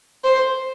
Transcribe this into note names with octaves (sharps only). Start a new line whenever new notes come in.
C5